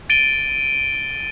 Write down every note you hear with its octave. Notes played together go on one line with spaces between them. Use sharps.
A6 D7 D#7 G7